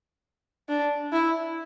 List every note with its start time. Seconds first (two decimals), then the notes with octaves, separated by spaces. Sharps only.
0.69 D4
1.13 E4